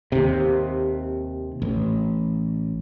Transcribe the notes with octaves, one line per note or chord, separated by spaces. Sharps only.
D#2 C3
A1